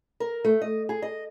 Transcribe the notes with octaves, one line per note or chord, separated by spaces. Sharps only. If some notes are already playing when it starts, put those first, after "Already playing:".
A#4
A3
D#5
G#4
D#5